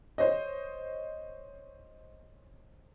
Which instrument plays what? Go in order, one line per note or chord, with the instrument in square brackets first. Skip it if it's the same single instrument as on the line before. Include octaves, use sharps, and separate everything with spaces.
[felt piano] C5 C#5 D#5